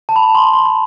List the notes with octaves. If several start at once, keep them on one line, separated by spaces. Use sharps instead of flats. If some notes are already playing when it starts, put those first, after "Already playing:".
A5
B5
C6
C6
C6